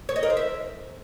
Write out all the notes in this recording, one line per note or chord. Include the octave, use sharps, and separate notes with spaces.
C#5
D#5
A#4
C5
E5